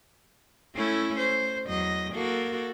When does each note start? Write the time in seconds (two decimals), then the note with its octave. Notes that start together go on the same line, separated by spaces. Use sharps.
0.75 A3 C#4 E4
1.18 C5
1.66 E2 F#3 D#5
2.13 A#3 F#4 A4